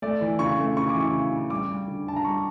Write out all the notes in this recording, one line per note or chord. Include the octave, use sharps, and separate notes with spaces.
A3 D5
E3
C#3 C#6
A3
C#3 C#6
D6
E3
C#6
C#3
C#3
G3 D6
G3
D3
D3 A5
A#5
G3 C#6